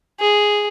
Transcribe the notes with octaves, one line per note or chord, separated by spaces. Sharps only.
G#4